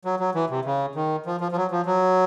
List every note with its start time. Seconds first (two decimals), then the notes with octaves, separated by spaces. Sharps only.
0.05 F#3
0.20 F#3
0.35 E3
0.50 C3
0.65 C#3
0.95 D#3
1.26 F3
1.41 F3
1.52 F3
1.56 F#3
1.71 F3
1.86 F#3